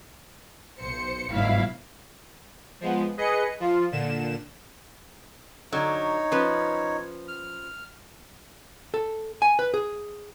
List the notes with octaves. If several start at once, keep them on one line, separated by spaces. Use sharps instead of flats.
B1 C5 C#7
G1 G#2 B2 F#3 E4 F5
F3 G#3 B3
G#4 B4 D#5 C#7
F3 F4
A#2 D3 E7
D3 F#3 D#4 C#5
F3 C#4 B4
F6
A4
G#5
B4
G#4